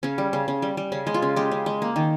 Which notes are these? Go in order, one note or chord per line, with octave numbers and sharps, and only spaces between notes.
C#3 C#4
G3
C#3
C#3
G3
G3
C#3 C#4
G#3
F4
C#3
G#3 G4
C#3
G#3
A#3
D#3